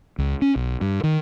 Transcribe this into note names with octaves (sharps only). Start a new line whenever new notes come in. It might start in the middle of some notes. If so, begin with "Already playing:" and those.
C#2
C#4
B1
G2
D#3